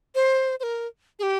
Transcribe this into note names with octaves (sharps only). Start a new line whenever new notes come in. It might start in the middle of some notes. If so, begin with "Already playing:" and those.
C5
C5
A#4
G#4
G4